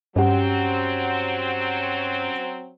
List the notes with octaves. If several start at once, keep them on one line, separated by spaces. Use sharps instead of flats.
G2 F#3 C4 C#4 G4 F#5